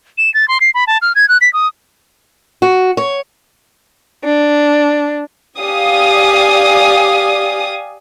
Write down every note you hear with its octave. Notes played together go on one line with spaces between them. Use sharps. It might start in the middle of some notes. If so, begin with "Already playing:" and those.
E7
A6
C6
C7
B5
A5
F6
G#6
F#6
B6
D#6
F#4
C#5
D4
G4 D5 F5 G#5 D#6